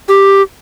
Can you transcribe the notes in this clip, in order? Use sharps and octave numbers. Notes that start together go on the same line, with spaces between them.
G4